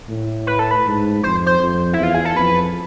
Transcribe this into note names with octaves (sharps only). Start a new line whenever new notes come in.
A2
B4
A4
B4
G#2
F2 C5
C5
F2
E2 E4
F4
G#4
A4
F2 B4